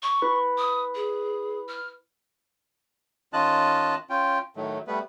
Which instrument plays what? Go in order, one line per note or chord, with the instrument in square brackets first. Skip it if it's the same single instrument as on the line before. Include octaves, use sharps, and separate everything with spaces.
[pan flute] C#6
[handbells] E4 B4 B5
[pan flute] D#6
G#4
F6
[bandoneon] D#3 C#4 F4 D#5 A5 F#6
C#4 F4 G5
A2 D#3 F#3 A3
G3 A3 B3 B4